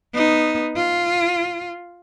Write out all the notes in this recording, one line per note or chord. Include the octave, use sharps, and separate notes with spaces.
B3 D#4
F4